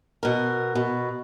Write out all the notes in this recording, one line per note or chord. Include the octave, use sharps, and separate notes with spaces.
B2 A#4
B2